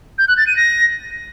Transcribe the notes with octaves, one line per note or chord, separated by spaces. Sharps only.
G6
F#6
A6
D#7
A#6